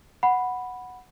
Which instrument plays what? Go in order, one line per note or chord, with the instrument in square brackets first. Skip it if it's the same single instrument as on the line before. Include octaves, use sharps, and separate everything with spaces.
[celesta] F#5 B5